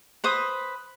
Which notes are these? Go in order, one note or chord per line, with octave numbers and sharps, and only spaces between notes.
B4 C5 D#6